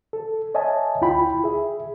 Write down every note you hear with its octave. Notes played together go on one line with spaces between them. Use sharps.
A4
C#5 D#5 E5 G#5 A5
D2 E4 F4 G5 B5
G#4 E5